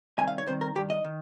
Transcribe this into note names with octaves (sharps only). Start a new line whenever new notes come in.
C2 C3 D#3 G#5
F5
C#5
C2 C3 D#3 C5
A#4
G2 D#3 G4
D#5
D#3